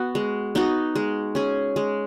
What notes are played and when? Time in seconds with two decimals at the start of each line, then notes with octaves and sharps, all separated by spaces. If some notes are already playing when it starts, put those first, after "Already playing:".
Already playing: B3 F#4
0.15 G#3
0.55 B3 D#4 F#4
0.95 G#3
1.35 C#4 G#4
1.76 G#3